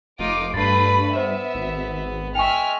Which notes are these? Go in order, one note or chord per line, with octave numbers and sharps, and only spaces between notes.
F1 D#4 F4 D6
G2 A3 B4 B5 A6 C7
B3 C5 E5
G#1
G#3 E5 G5 G#5 C#6 F6